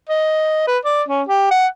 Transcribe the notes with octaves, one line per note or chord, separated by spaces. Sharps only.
D#5
B4
D5
C#4
G4
F#5